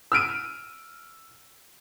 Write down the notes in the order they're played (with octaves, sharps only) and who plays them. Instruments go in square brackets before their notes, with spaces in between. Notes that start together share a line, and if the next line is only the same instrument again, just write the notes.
[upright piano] E6 F6 D7 D#7